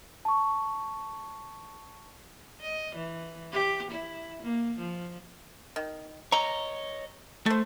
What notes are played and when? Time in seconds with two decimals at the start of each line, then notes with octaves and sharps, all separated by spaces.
0.25 A5 C#6
2.61 D#5
2.95 E3
3.52 G4
3.91 E4
4.42 A#3
4.78 F3
5.76 D#3
6.32 C#5 D#5 A#5
7.46 A3 A4 C5